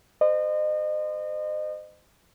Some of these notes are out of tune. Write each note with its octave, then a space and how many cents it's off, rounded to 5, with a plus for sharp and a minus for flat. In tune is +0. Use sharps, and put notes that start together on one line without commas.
C5 -30 D#5 -30